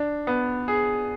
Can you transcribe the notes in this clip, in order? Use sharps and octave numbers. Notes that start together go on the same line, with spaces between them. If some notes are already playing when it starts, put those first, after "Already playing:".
Already playing: D4
B3
G#4